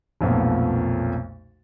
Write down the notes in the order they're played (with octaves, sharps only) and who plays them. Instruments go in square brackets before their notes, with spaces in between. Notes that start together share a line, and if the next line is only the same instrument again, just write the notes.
[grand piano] B1 F2 A#2 A3 B3